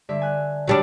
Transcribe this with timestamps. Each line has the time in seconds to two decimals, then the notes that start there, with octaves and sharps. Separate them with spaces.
0.09 G2 D3 E5
0.22 G#5 F#6
0.67 F#3 G3 D4